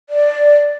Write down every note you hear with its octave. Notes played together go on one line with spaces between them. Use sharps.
D5